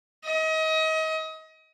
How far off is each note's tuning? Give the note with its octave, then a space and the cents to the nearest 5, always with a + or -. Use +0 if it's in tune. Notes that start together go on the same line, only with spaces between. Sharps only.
D#5 +35